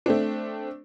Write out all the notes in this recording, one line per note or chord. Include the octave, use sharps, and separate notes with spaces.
A3 C4 D4